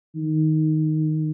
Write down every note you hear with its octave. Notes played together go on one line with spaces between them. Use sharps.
D#3